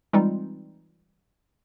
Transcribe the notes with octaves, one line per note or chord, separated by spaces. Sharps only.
E3 G3 G#3 C4 D#4 F4